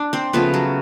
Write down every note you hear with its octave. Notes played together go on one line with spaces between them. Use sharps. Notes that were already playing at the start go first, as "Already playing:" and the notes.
Already playing: D4 D5
C4 C5
C#3 F3 A3 B3 B4
F#3 F#4